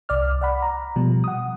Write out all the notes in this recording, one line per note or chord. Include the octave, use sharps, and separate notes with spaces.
C2 D5 F6
D5 F#5 B5
A#5
B2 F3 G3
F#5 D#6